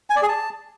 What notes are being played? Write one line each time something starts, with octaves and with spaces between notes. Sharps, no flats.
G#5
D5
G#4
A5